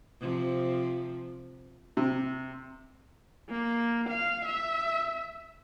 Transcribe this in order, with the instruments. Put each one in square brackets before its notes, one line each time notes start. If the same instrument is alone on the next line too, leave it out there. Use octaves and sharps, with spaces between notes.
[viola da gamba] C3 F3
[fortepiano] C3
[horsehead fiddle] A#3
F5
E5